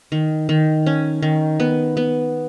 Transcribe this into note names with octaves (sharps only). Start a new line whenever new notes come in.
D#3
D#3
C#4
D#3
B3
B3